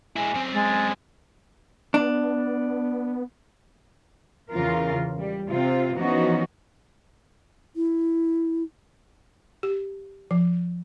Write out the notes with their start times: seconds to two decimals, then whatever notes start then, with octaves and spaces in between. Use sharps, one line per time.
0.16 G#3 E4 G#5
0.34 F#2 C4
0.53 G#3 A6
1.94 B3 D4
4.54 E2 C#3 E3 F4 A#4
5.18 G3
5.50 C3 C4 F4
5.97 E3 F3 B3 C#4 D#4 F#4
7.76 E4
9.63 G4
10.31 F3